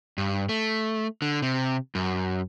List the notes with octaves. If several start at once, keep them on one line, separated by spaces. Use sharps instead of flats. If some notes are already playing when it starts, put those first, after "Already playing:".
G2
A3
D3
C3
F#2